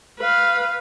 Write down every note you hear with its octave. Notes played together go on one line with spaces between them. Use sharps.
B4 F5